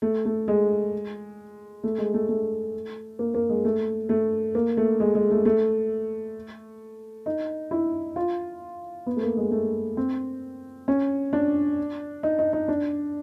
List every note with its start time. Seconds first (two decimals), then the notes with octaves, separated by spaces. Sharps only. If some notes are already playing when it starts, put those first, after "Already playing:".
0.02 A3
0.25 A3
0.48 G#3
1.84 A3
1.98 G#3
2.14 A3
2.29 A3
3.19 A#3
3.34 A#3
3.49 G#3
3.65 A3
4.09 A3
4.55 A#3
4.77 A3
5.00 G#3
5.15 G#3
5.31 A3
5.45 A3
7.26 D#4
7.71 E4
8.16 F4
9.07 B3
9.17 A3
9.22 A#3
9.37 G#3
9.52 A3
9.97 C4
10.88 C#4
11.33 D4
12.23 D#4
12.39 D#4
12.53 D#4
12.68 D4